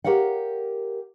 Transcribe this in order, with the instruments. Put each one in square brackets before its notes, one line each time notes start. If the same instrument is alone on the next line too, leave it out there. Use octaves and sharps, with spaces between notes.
[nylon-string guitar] G4 A#4 C#5 F5 F#5